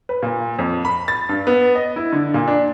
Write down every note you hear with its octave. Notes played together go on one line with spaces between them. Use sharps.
B4
A#2
F2
B5
A6
G2
B3
D#5
E4
D3
A#2
D4